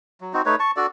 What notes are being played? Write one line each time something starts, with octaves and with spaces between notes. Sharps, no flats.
F#3
C4 D#4 F#4
A3 D#4 B4 C#5
A5 C#6
D4 F#4 A4 D5